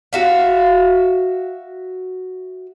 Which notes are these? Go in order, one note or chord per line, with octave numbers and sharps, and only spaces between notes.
F#4 E5 F5